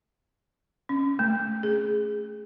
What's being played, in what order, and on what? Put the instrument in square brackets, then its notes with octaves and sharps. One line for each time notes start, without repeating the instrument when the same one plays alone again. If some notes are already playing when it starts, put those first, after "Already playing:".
[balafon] C#4
A3
G#4